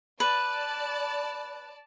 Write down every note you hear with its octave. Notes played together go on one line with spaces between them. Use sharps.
B4 D5 A5